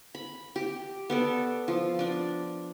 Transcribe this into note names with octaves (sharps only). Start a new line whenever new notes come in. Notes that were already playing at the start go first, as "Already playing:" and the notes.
B5
G4
B3 A4 D5
F3
D4 D5